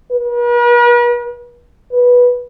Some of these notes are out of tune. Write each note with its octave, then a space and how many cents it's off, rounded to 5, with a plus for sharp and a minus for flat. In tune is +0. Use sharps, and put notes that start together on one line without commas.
B4 -45
B4 -10